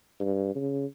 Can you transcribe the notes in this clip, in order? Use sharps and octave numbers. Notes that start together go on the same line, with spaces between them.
G2
C#3